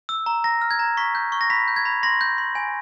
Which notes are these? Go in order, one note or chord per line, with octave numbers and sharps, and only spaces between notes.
E6
A#5
A#5 A#6
F6
G#6
A#5
C#6 B6
G6
C#6
A#6
B5 B6
G6
G#6
B5
C6 A#6
G6
C6
G#5